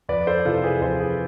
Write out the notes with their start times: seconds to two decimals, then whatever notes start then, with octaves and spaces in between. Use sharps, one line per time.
0.09 F2 B4 D5
0.27 A4 C5
0.45 C3 E3 F4 A4
0.64 G#4 B4
0.81 F2 A4 C5
1.00 G#4 B4